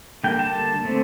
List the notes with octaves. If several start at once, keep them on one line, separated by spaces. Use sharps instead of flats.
D3 G3 A#3 G5
A5
D3 A3 C4